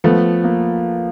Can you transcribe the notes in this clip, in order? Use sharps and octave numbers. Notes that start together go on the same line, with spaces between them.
F3 A3 B3
A#3